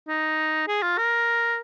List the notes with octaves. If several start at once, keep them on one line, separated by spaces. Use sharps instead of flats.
D#4
G#4
F4
A#4